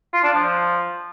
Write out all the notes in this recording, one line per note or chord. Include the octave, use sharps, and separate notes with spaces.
F4
D4
F3